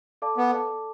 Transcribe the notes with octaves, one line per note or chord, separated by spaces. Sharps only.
A4 D5 F5 A5 D6
B3
A4 D5 F5 A5 D6